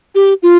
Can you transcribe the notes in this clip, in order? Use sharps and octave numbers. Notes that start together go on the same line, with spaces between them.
G4
F4